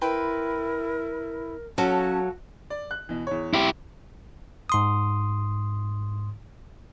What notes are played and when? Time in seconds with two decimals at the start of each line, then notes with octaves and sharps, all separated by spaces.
0.01 E4 A#4 B4 G5 C6
1.78 F#3 C#4 F#4 A4 F5 A5
2.70 D5
2.91 F#6
3.09 B2 E3
3.27 E2 C#5
3.54 E4 G4
4.70 G#2 C6 D#6